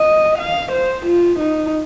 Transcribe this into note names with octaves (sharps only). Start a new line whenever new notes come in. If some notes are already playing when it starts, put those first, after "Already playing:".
Already playing: D#5
F5
C5
F4
D#4